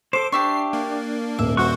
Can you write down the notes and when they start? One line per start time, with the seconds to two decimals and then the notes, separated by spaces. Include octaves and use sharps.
0.13 A4 C5 D6
0.32 D4 G4 E5 C#6 C7
0.73 A#3
1.39 D#1 E5
1.57 G2 F#4 C5 C#6 F#6